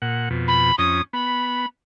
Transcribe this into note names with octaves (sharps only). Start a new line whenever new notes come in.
A#2 F#5
F2 B2
B5
F2 C#4 D#6
B3 B5